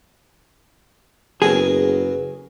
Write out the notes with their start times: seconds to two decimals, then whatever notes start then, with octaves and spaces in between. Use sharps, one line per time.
1.42 F#1 F#3 B3 G#4 A#4